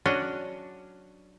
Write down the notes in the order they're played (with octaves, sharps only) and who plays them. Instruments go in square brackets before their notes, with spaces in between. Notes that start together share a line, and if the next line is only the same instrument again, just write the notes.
[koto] F#3 C#4 D4 F#4 D#5